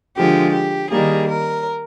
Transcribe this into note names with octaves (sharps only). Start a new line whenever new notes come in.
D3 F3 G#3 G4
G4
D#3 G3 A#3 G#4
A#4